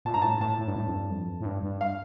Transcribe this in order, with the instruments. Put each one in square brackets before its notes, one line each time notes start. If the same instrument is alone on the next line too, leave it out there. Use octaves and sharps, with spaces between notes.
[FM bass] A#2 [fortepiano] A5
[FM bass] G2 [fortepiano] A#5
[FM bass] A2 [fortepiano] A5
[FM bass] A2 [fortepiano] A5
[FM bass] A2
G2
A2
F2
G2
F2
A2
G2
G2
[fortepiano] F5